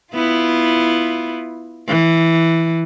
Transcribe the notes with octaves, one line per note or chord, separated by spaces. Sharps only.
B3 E4 F4
E3